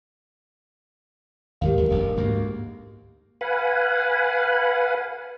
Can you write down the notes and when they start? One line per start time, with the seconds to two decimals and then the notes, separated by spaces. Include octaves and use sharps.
1.61 D#2 G#2 D#3 G4 A#4 F5
1.74 E2 G#3
1.90 F1 A#1 G2
2.17 D2 G#2 A#3
3.41 B4 F5 F#5 G#5 B5